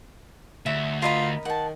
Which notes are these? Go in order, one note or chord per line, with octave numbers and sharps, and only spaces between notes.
D2 E5
F4 A#4 D#5 B5
D#3 F#5 A5